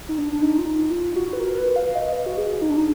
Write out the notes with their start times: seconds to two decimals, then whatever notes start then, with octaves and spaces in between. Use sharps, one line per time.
0.09 D#4
0.18 D4
0.32 D4
0.42 D#4
0.59 F4
0.66 D#4
0.91 F4
1.16 F#4
1.33 B4
1.40 A#4
1.58 B4
1.76 F5
1.95 D#5
2.13 B4
2.26 F#4
2.37 G#4
2.62 D#4
2.69 D4
2.77 D#4